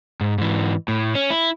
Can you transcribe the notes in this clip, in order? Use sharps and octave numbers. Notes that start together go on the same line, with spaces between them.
G#2
G#2 E3
A2
C#4
E4